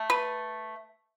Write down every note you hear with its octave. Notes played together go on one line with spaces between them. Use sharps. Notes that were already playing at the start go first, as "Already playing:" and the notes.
Already playing: A3
B4